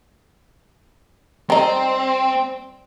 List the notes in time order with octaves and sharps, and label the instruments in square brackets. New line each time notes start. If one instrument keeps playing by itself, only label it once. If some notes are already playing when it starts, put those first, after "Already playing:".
[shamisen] G3 D#4 [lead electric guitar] C4